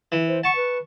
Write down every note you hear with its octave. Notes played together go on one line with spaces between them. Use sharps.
E3
C5
F#5 A5 C#6
B4